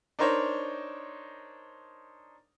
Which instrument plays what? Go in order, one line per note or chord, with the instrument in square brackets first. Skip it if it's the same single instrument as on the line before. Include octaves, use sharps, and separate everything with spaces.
[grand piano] D4 D#4 A#4 C5 C#5